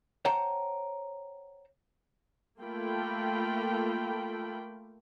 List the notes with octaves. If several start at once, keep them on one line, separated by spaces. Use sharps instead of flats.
C5 C#5 F#5 G5 A5 A#5
A3 A#3 F4 A4 G5 B5